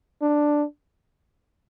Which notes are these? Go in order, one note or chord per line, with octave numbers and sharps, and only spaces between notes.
D4